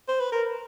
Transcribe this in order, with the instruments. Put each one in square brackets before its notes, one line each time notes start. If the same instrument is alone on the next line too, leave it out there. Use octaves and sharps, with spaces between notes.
[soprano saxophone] C5
B4
A#4